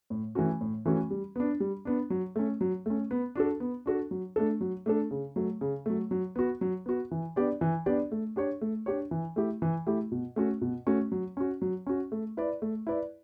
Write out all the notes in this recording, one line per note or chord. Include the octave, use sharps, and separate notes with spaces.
A2
E3 A3 C#4 F#4
A2
E3 A3 C#4 F#4
G3
B3 D4
G3
B3 D4
F#3
A3 C#4
F#3
A3 C#4
B3
D4 F#4 A4
B3
D4 F#4 A4
F#3
A3 D4 A4
F#3
A3 D4 A4
C#3
F#3 A3
C#3
F#3 A3
F#3
B3 F#4
F#3
B3 F#4
E3
B3 D4 G4 D5
E3
B3 D4 G4 D5
A3
D4 G4 C#5
A3
D4 G4 C#5
E3
A3 E4 G4
E3
A3 E4 G4
B2
A3 C#4 F#4
B2
A3 C#4 F#4
F#3
C#4 F#4
F#3
C#4 F#4
A3
E4 B4 D5
A3
E4 B4 D5